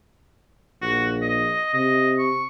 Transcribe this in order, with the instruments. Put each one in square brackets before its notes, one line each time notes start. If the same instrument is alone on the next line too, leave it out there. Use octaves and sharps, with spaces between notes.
[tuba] A#1 [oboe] F#4
[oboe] D#5
[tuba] C3 [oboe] D#5
[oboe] C#6